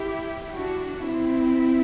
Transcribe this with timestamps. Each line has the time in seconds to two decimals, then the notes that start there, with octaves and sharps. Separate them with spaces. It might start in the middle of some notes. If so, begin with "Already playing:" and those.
Already playing: E4 G4
0.51 D4 F#4
1.05 C4 E4